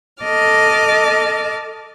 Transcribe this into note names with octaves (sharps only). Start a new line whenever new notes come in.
A4 D#5 A5 D6 F6